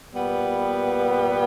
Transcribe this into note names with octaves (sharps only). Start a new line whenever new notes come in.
A#2 G3 B3